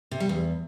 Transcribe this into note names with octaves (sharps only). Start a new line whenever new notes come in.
C3
G3
E2